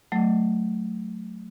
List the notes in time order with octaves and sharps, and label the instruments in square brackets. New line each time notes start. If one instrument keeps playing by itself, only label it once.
[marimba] F#3 A3